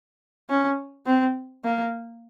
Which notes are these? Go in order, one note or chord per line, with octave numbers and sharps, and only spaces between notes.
C#4
C4
A#3